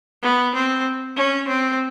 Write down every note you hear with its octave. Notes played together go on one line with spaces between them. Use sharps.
B3
C4
C#4
C4